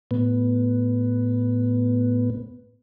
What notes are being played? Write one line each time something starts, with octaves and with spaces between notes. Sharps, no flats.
A2 B3